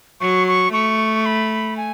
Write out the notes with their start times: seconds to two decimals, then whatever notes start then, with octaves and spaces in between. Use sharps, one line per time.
0.21 F#3 C#6
0.48 C#6
0.73 A3 C#6
1.26 B5
1.77 G#5